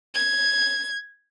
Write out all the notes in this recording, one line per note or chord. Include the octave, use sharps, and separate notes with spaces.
G#6